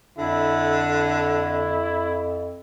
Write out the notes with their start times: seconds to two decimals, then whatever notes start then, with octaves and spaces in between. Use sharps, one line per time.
0.18 F2 D3 E4
0.95 E4